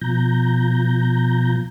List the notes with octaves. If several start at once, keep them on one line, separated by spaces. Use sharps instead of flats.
B2 F3 A#5 G6